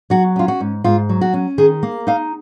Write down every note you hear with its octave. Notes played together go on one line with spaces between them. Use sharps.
F#3 F#4
C#4 F4
F#4
G#2
G#2 F4
F#3
F#4
C#4
D#3 G#4
A#3
D#4 F5